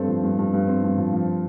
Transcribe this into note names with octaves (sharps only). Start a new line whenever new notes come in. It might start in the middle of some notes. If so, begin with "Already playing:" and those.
Already playing: G2 C4 A4 C5
F3
G2
G2
G2
C4
G2
F3
F3